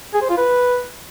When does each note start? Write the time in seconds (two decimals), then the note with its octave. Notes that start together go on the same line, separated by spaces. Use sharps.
0.14 G#4
0.22 C5
0.30 F4
0.37 B4